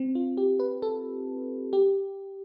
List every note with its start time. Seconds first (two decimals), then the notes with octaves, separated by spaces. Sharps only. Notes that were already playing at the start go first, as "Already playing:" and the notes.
Already playing: C4
0.15 F4
0.37 G4
0.59 B4
0.82 A4
1.73 G4